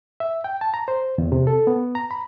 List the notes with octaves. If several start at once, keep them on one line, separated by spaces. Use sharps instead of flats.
E5
G5
A5
A#5
C5
E2
C3
A4
B3
A#5
B5